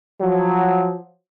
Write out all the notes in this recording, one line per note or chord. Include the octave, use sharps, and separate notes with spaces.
F3 F#3